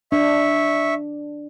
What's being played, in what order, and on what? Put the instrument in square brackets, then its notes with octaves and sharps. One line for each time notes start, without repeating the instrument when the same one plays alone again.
[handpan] D4 [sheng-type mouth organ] E5 C#6